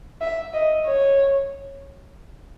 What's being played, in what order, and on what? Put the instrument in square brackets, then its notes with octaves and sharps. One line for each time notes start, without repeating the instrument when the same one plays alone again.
[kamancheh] E5
D#5
C#5